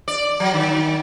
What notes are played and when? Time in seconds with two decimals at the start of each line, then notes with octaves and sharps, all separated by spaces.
0.08 D5
0.40 F#3
0.54 D#3